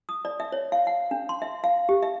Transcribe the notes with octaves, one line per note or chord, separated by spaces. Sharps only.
D#6
D5
E5
C#5
F5
F#5
D4
C6
E5
F5
G4
E5